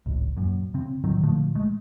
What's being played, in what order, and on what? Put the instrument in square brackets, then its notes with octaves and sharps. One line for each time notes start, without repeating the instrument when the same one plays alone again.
[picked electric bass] D1 G#1 C#2
F#2 A#2
C#3 C4
A2 D3 D#3 F#3
A#2 D3 F3 A3
G#3 A3